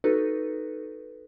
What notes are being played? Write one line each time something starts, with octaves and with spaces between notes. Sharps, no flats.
D#4 F#4 A4 B4